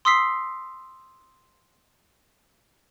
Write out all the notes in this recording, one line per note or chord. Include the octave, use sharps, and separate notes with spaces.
C6 D#6 E6 B6 C7